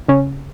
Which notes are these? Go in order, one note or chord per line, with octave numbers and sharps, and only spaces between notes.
C#3 C#4